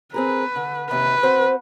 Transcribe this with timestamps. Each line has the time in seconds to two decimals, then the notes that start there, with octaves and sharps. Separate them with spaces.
0.14 C4 G#4 A#4 B4
0.56 D3
0.90 D#2 C3 B4
1.23 C4 F#4 C5